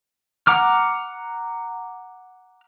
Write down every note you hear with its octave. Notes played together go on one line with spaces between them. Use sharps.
F#5 A#5 D6 F6